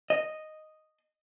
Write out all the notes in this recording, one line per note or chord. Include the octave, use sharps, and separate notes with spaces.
D#5